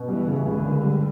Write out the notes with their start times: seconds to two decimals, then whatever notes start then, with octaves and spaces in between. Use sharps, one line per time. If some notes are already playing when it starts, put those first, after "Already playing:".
Already playing: B2
0.08 E3 G3
0.27 C#3
0.45 C#2 D3
0.65 A#3
0.83 G3